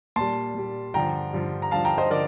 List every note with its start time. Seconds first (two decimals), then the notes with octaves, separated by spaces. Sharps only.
0.16 A#2 G3 A5 C6
0.55 A#2 G3
0.94 G2 D3 F3 G5 A#5
1.33 G2 D3 F3
1.62 A#5
1.71 G2 D3 F3 F5 A5
1.85 G5 A#5
1.98 C5 D#5
2.10 D3 F3 A#4 D5